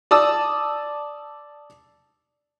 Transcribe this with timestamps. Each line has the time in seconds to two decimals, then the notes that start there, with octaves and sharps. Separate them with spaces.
0.11 D5 A5 D#6 E6